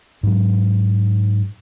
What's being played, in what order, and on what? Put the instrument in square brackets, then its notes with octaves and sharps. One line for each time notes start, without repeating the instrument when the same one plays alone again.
[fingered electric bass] G#2 F#3